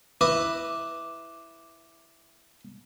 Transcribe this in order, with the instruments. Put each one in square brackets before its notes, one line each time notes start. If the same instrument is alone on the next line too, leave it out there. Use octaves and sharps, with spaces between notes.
[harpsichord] E4 B4 D#5 [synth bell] D6